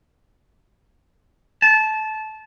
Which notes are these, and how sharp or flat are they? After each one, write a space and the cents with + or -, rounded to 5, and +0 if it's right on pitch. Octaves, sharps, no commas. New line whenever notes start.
A5 -20